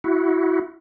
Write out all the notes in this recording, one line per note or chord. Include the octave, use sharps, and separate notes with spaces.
E4 F#4